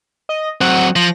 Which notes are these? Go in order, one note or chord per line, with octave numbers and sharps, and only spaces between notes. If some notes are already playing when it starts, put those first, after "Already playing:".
D#5
F#3 C4 F#5
F3 A#6